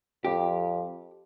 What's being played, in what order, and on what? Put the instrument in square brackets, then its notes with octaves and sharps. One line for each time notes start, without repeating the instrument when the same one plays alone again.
[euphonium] F2 [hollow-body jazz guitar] G4